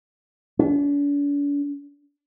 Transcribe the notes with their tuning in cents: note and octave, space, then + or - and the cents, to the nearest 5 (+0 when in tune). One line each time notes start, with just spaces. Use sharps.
D4 -45